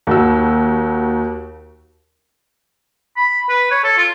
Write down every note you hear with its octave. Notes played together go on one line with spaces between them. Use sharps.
D#2 F#4 E6
B5
B4
C#5
A4
F4